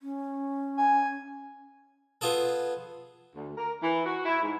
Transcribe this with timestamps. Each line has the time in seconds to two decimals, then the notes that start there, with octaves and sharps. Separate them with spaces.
0.01 C#4
0.77 G#5
2.21 B3 F4 G#4 A4
3.35 D2
3.56 A#4
3.82 E3
4.05 F#4
4.26 E4
4.42 G#2